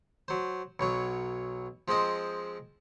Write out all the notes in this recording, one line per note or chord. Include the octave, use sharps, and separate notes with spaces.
F#3 C5
B1 F#3 C#5
F3 G#3 C4 C5 D#5